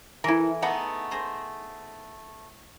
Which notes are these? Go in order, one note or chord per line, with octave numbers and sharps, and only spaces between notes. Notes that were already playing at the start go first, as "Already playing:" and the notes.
E3 E4 A4 A#4
A3 B3 D#4 G#4 B4 F#5
G#4 C5 A#5